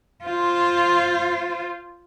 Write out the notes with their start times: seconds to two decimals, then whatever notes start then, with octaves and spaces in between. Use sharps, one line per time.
0.24 F4 C5